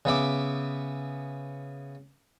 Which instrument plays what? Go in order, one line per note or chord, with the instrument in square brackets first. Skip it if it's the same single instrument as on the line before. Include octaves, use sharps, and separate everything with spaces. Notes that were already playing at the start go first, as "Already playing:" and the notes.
[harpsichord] C#3 B3 E5 D6